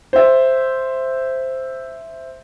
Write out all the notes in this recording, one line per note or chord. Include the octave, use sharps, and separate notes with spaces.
C5 E5